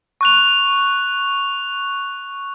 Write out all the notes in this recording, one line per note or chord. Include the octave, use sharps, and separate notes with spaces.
C#6 F#6 F7